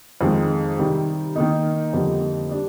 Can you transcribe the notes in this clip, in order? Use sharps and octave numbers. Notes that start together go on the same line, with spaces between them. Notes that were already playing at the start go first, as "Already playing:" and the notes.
F2 D#3 G#3
C3 D#3 G3
D#3 A#3 D#4
F2 D3 G3 A#3 D#4
G3 D4